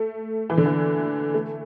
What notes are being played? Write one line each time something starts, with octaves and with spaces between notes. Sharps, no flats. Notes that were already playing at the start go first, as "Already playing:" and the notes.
Already playing: A3
E3
D3
E3
A3